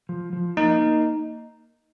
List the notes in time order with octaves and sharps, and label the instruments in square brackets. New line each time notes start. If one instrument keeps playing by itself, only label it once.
[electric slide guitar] F3
F3
[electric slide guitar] A#3 [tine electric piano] D#4
[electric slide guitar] A#3